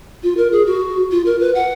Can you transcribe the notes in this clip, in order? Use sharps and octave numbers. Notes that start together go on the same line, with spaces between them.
F4
A#4
G#4
F#4
F4
A#4
B4
F#5